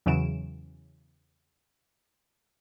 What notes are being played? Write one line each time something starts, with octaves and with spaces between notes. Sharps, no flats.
E2 C#3 E3 F#3 D7 E7